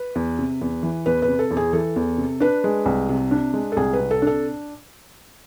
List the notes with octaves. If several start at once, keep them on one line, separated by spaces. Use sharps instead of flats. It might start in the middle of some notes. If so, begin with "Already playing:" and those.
Already playing: B4
E2
C3
E2
E3
E2 B4
B4
C3
A4
E2
G#4
E3 A4
E2
C3
D4 B4
G#3
C2
C3
D4
G#3
A4
C2 G#4
B4
C3
A4
D4 A4